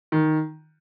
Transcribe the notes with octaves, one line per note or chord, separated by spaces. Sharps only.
D#3